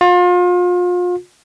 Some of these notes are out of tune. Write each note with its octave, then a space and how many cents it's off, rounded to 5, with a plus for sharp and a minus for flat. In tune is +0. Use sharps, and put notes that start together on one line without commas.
F4 +35